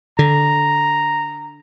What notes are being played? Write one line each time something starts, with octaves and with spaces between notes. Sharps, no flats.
D3 A#5